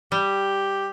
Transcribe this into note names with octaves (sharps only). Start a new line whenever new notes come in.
G3 G4